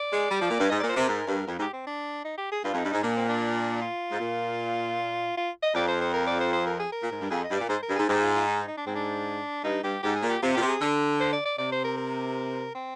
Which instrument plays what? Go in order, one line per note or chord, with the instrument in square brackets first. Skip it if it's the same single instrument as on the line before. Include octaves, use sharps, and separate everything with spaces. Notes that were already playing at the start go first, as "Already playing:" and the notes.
Already playing: [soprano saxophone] D5
[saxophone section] G#3
G3
F3
A#2
G2
[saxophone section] G#2 [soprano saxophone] D#5
[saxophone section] A#2 [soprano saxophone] D5
[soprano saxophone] C5
[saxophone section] C3 [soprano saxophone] A#4
[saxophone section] G#2
G2
F2
G#2
[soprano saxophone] G4
C4
D4
D#4
G4
G#4
[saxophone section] G2 [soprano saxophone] F4
[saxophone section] F2
[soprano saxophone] D#4
[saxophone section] G2
[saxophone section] G#2 [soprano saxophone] D#4
[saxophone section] A#2 [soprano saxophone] D4
[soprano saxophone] C4
D4
F4
[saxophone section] G#2
A#2
[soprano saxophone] F4
D#5
[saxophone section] F2 [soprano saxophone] D5
[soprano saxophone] C5
C5
A#4
D5
C5
C5
A#4
G#4
A#4
[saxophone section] A#2
G#2
G2
[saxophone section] F2 [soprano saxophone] G#4
[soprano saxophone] D#5
[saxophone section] G2
[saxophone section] A#2 [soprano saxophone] D5
[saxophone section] G#2 [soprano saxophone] C5
[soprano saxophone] A#4
[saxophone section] G2
[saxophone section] G#2 [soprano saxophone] G#4
[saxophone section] G#2 [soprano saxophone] G4
[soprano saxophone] F4
F4
D#4
D#4
D4
[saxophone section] G#2 [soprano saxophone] C4
[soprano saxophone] D4
[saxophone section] G2 [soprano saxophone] D#4
[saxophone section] G2 [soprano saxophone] G4
[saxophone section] G#2 [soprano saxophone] G4
[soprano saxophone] G#4
[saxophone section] A#2
[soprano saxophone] G4
[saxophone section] C3 [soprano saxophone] F4
[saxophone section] A#2 [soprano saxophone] G4
[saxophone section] C3
[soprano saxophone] G#4
[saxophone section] D3
[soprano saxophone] C5
D5
D5
[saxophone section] C3 [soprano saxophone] D5
[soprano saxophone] C5
A#4
A#4
C4